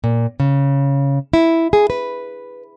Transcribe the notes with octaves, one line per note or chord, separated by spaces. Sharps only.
A#2
C#3
E4
G#4
B4